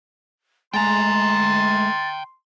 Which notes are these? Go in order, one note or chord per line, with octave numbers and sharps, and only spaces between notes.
G#3 A3 G5 G#5 A#5 C6 A6